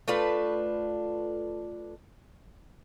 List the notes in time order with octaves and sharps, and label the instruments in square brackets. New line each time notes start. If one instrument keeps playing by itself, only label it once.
[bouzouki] A3 D4 F4 B4